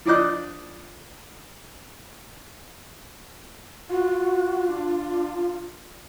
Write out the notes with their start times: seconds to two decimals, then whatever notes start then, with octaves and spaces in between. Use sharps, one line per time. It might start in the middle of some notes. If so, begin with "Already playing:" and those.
0.05 F3 D4 D5 D#5 F#6
3.89 F4 F#4
4.68 D4